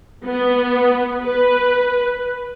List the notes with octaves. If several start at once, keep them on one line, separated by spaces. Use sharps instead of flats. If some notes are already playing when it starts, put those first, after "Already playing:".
B3
B4